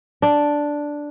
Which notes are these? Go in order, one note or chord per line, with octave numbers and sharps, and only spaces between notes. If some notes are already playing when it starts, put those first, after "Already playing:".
D4